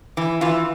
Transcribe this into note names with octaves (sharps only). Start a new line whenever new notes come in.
E3
E3 F4